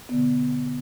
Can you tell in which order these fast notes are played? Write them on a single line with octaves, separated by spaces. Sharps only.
B3 D3 B2